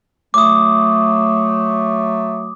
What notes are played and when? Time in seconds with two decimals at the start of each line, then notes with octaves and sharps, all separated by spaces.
0.34 F#3 A3 D6 D#6